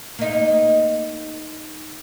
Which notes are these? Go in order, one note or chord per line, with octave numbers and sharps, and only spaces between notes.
A#3 D#4